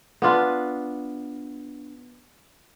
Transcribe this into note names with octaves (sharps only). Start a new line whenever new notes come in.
B3 D4 F4 B4